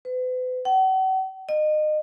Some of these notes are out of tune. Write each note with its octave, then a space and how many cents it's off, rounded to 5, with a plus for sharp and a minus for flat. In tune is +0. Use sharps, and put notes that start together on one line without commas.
B4 +40
F#5 +40
D#5 -30